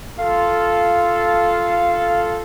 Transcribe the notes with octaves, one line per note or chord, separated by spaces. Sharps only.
F4 A4 F5